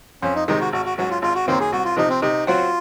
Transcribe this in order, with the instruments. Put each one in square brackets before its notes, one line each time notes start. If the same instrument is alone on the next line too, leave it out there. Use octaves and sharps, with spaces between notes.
[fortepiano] F2 [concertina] C#4
[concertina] D#4
[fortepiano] C3 D#3 G#3 [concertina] D#4
[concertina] F#4
[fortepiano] G#1 [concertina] F#4
[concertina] F#4
[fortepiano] G#2 F#3 C#4 [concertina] F#4
[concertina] F4
[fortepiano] G#1 [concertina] F4
[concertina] F#4
[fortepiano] F#2 D#3 F#3 A#3 [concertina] C4
[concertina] G#4
[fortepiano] C2 [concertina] F#4
[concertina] F4
[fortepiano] C3 F3 [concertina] D#4
[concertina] C4
[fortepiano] C3 [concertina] D#4
[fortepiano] F#3 C4 F#4 [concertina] F4